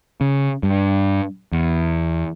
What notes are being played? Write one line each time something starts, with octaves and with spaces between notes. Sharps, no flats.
C#3
G2
E2